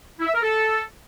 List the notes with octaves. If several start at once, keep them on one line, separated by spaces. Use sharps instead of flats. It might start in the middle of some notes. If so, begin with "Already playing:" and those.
E4
E5
A#4
A4